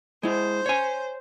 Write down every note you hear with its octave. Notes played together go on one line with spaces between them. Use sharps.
G#3 E4 C5
C#5 G#5